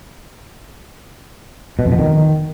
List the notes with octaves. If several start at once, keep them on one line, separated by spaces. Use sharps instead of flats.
B2
F2
B2
D#3